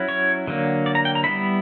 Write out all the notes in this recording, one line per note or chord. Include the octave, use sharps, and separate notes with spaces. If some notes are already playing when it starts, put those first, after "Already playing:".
Already playing: F#3 C#4 E4
C#5
D3 F#3 A#3
D5
A#5
G5
A#5
G3 B3 E4 B5